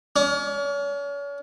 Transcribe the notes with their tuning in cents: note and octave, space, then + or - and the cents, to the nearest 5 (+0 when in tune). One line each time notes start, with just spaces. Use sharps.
C#4 +40